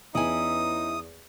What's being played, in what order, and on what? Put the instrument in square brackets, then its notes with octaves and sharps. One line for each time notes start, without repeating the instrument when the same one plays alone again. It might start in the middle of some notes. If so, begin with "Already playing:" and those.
[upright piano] E2 [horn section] B3 C#4 D#4 [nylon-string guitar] E4 G#5 [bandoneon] D#6